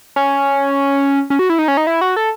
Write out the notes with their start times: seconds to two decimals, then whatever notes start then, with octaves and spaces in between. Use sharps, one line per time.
0.16 C#4
1.30 C#4
1.39 F#4
1.50 E4
1.59 D#4
1.68 C#4
1.77 D#4
1.87 E4
2.01 F#4
2.16 A4